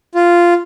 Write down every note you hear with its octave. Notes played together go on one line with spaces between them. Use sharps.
F4